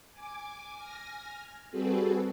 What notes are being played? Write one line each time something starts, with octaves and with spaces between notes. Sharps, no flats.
G#5 D6
G#5 F6 A#6
G3 C4 F#4 G#4 A4 B4